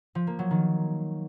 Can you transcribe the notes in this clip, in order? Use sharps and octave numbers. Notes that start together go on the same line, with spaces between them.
F3
A#3
F#3
D#3